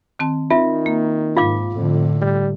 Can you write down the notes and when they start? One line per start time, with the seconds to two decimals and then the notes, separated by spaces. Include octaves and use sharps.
0.19 D#3 C4 A5
0.51 D#3 C4 F4 E5
0.86 A#3
1.37 G#2 F4 F5 D6
1.76 F2 A2 D3
2.21 G3